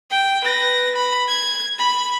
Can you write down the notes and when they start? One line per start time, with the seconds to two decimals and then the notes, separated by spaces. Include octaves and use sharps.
0.11 G5
0.44 B4 A#6
0.96 B5
1.28 G#6
1.79 B5